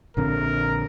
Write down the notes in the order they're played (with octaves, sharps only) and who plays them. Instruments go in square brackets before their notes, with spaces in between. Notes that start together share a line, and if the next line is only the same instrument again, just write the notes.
[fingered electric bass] A#1 D3 C4 [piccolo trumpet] A#4